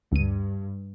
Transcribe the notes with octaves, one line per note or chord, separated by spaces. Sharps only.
D2 G2 D#7